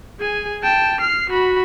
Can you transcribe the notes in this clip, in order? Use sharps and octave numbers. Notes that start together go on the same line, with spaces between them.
G#4 G#5
G5 A5
F6 C7
F#4 B5